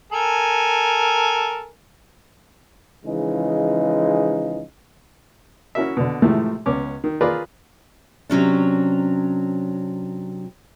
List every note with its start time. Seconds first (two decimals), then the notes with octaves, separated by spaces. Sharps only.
0.12 A4 A#4 G#5
3.06 C#3 E3 F3 G#3 D#4
5.75 C#4 E4 F#4 A#4 E5
5.97 B2 D3
6.22 A2 C3 E3 F3 G#3 A3
6.66 C#2 B3 C#4 D6
7.04 D#3
7.21 F4 G#4 A#4 B4 D5
8.30 C3 F#3 C#4 D4